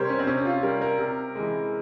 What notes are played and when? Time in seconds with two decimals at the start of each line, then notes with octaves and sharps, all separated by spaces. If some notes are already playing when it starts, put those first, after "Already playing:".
Already playing: C3 G3 G4 A#4 C5 C#5
0.09 C#4
0.19 C4
0.27 C3 C#4
0.45 F4
0.63 G3 A#4
0.81 A#4
0.99 C3
1.35 E3 G#3